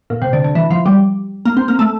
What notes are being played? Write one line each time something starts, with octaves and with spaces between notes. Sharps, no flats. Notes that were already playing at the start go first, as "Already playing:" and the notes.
A#2
C3
D3
D3
E3
F3
G3
A#3
C4
A#3
A3